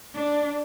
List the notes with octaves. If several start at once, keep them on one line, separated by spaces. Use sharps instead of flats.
D4